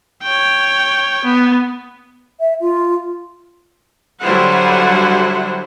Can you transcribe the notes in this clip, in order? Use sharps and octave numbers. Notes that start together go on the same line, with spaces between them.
C#5 G5
B3
E5
F4
D3 F#3 G3 E4 C5 F#5